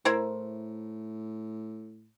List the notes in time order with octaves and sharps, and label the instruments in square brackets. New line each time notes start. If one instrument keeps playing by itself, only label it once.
[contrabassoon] A2 [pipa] E4 A#4 C5